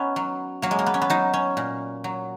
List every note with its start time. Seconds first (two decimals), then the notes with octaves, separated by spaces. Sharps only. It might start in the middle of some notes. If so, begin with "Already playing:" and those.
Already playing: B3 C#4 D#4
0.16 F#3
0.62 F#3 A#3
0.71 G#3
0.79 A#3
0.86 B3
0.94 C#4
1.02 B3
1.10 F#3 D#4
1.33 C#4
1.57 A#2
2.04 F#3